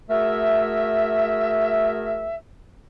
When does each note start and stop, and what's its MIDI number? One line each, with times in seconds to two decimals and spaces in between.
0.10 2.36 57
0.10 2.36 66
0.10 2.36 68
0.10 2.36 70
0.10 2.36 76